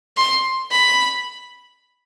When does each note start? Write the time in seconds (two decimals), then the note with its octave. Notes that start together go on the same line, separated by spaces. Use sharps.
0.17 C6
0.71 B5